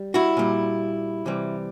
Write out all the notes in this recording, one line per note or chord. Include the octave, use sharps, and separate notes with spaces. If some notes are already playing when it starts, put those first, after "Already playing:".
Already playing: G3
E4 F#4
A#2 G3
C3 E3 G3